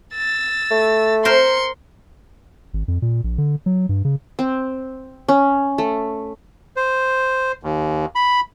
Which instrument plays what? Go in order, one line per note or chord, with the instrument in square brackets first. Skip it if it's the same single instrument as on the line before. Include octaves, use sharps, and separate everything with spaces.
[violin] E6 A6
[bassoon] A3
[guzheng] A#4 C5 [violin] C6 C#7
[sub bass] G#1
F2
A#2
A#1
D3
F#3
G2
C#3
[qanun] C4
C#4
A3
[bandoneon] C5
D#2
B5